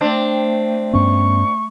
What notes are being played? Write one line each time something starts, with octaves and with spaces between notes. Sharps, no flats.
A3 C4 D4
G2 B3 C#4 C#6